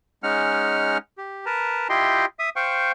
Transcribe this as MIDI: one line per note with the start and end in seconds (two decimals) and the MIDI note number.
0.23 0.98 56
0.23 0.98 61
0.23 0.98 63
0.23 0.98 78
0.23 0.98 89
1.18 1.45 67
1.46 1.88 70
1.46 1.88 71
1.46 1.88 81
1.46 1.88 82
1.89 2.26 64
1.89 2.26 65
1.89 2.26 67
1.89 2.26 75
1.89 2.26 79
1.89 2.26 84
2.39 2.49 76
2.39 2.49 87
2.56 2.92 72
2.56 2.92 77
2.56 2.92 79
2.56 2.92 85